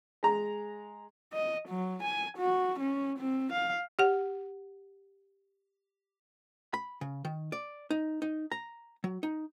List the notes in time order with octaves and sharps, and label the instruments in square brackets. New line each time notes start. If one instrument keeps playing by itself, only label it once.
[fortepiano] G#3 A#5
[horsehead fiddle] D#5
F#3
G#5
F#4
C#4
C4
F5
[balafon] G4 F#5
[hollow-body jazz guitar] B5
C#3
D#3
D5
D#4
D#4
A#5
F#3
D#4